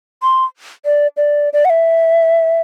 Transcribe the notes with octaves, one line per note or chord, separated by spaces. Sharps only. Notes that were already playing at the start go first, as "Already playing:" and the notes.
C6
D5
D5
D5
F#5
E5